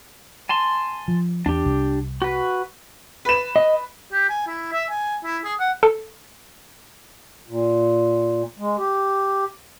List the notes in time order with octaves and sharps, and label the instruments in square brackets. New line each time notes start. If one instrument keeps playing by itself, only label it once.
[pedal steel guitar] G#5 A5 C6
[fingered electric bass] F3
[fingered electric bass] E2 [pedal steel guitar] D4 G4
[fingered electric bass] C2
[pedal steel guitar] F#4 B4
[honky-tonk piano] B4 E7
[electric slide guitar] D#5
[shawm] G4
G#5
E4
E5
G#5
E4
G#4
F#5
[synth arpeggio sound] A4
[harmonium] A#2
G#3
G4